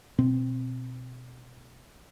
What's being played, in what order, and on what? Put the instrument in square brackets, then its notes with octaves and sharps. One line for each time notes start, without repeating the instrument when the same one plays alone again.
[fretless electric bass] B2 C4